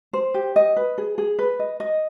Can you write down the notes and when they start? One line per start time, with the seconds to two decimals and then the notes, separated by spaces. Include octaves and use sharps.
0.13 C5
0.34 G4
0.56 D#5
0.77 B4
0.98 G#4
1.18 G#4
1.39 B4
1.59 D#5
1.80 D#5